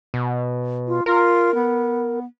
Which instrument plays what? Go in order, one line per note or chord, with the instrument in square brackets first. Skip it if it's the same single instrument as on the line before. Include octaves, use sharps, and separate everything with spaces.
[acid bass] B2
[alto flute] F4
[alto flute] F4 [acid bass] A#4
[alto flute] B3